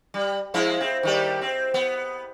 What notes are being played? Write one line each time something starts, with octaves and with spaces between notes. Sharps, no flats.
G3
F3 G#3 E4
C4
D#3 G3 G4
C4
B3